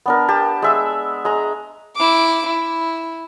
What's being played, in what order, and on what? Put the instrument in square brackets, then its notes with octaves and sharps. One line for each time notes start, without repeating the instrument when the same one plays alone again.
[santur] B3 D4 A#4
G4 A5
G#3 E5 E6
G#3 A#5
[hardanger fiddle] E4 D6
E4